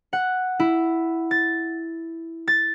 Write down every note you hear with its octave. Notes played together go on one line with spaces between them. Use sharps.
F#5
E4
A6
A6